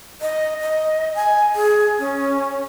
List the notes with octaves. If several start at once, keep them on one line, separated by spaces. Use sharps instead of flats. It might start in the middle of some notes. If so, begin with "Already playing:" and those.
D#5
D#5
G#5
G#4
C#4